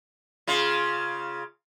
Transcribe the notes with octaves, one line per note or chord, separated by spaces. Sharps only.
C#3 F4